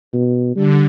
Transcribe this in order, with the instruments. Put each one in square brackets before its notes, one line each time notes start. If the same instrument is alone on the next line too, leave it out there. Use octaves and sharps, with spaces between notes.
[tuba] B2
[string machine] D3 [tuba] G3